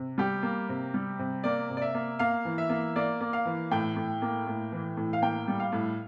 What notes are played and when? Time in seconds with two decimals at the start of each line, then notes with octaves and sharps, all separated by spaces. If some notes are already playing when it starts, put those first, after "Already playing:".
Already playing: C3
0.18 G3 G4
0.43 A#3
0.69 C3
0.94 G3
1.19 C3
1.44 A#3 D5
1.70 C3
1.77 D5
1.82 E5
1.95 A#3
2.19 A#3 F5
2.45 E3
2.58 E5
2.70 A#3
2.96 A#3 D5
3.21 A#3
3.33 F5
3.46 E3
3.71 A2 G5
3.96 A2
4.22 A#3
4.47 A2
4.72 E3
4.97 A2
5.13 F5
5.22 A#3 G5
5.48 G3
5.60 F5
5.72 A2